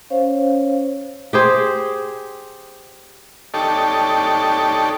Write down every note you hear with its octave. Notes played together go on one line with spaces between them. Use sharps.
C#4 C5 C#5 F5
G4 G#4 C5
D#4 G4 A4 C#5 D5 A5